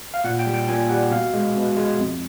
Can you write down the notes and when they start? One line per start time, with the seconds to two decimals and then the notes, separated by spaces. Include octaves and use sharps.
0.14 F5
0.24 A#2 F#5
0.39 G5
0.46 G3
0.54 G5
0.68 A#2 G#5
0.89 G3 F#5
1.11 B2 F5
1.34 G#3
1.55 B2
1.76 G#3
1.98 F2